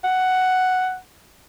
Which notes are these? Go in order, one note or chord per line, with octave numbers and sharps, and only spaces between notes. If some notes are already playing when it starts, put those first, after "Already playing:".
F#5